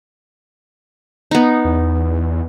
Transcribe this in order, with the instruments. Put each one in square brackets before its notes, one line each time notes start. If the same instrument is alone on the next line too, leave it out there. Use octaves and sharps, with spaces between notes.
[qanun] B3 D#4
[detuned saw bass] E2